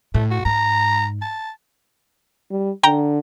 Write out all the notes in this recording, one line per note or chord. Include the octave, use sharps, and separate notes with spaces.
A2 A3
F#4
G#2 A#5
A5
G3
D3 G5 A#5